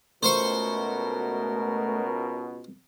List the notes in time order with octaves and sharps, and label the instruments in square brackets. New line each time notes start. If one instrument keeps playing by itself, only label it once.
[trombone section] C#2 B2 [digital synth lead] A3 [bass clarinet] A#4 [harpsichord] C5 C6 C#6